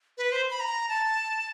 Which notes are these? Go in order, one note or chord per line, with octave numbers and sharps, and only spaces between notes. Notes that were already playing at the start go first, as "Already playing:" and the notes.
B4
C5
B5
A#5
A5